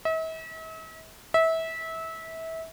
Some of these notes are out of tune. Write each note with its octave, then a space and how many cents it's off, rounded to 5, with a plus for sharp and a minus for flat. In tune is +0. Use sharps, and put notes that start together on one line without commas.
E5 -45
E5 -25